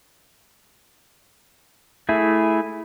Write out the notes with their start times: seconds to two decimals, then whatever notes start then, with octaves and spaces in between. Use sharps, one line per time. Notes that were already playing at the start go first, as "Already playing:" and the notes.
2.09 A3 E4 G#4